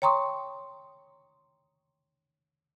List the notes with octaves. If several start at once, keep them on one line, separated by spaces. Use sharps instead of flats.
C#5 G5 A#5 C6 C#6 D#6